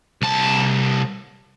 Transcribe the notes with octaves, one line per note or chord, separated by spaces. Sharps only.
C2 A5